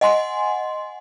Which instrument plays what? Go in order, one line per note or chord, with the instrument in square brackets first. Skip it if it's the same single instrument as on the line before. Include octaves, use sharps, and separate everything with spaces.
[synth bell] D#5 F#5 G#5 C6